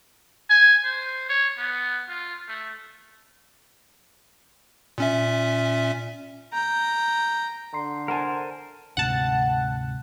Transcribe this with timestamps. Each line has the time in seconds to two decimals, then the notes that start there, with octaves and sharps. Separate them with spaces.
0.50 G#5
0.84 C5
1.29 C#5
1.58 B3
2.09 F4
2.49 A3
4.98 A#2 C#4 E5
6.53 G5 A#5
7.73 D3 A#5 C6 C7
8.08 A#4 C5 F#5 G#5 A5
8.97 D2 G#2 C3 F#5 A5